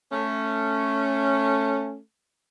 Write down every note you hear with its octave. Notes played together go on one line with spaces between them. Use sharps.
A3 C#4